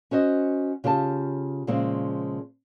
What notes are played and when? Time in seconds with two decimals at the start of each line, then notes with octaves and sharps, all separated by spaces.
0.11 C#4 F#4 C5 D#5
0.84 C#3 F4 G4 C#5 A5
1.67 A#2 C#3 F3 G#3 C4